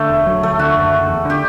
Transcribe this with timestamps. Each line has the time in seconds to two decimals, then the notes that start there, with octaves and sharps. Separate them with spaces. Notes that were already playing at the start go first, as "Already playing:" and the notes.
Already playing: D3 A3
0.10 E1
0.27 F#3
0.43 D2 A3
0.59 D3 F#4
0.75 F#1
0.92 F#1
1.08 E2
1.25 D3 G4